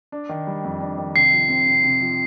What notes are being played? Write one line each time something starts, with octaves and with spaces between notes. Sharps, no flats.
D4
D#3
G3
F2
D4
D#3
C3 C7
F3
C4
C3
C3
F3